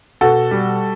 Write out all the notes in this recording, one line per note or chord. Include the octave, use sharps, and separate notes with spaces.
B2 F#4 A4
G3